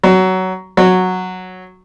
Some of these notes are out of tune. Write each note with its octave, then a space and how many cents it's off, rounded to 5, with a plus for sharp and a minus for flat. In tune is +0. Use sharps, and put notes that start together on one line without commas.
F#3 +15
F#3 -5